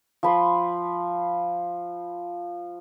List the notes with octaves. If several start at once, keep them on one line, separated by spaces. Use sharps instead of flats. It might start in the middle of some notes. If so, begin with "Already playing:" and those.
F3 B5 C6